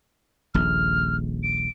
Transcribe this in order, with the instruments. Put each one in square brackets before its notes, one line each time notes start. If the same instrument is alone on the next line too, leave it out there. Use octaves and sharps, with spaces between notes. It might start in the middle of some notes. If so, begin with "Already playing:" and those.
[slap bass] D#1 A#1 [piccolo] F6
[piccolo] D7